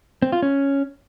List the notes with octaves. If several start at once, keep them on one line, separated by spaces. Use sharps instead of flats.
C4
F4
C#4